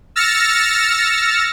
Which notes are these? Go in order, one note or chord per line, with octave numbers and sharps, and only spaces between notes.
E6 F6 A6 A#6 C#7